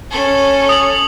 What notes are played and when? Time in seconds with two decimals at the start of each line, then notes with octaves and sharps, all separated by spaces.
0.11 C#4 A4
0.69 D#6 F#7